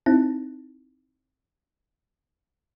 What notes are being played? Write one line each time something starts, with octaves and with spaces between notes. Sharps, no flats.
C4 D#4 E4 A5